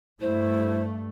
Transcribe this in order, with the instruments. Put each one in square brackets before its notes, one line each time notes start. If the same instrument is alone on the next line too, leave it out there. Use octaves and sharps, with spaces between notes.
[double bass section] G2 A3 [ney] E4 [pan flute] C5